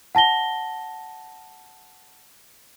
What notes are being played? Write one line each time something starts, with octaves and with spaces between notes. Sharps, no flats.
F#5 A5 A#6 G7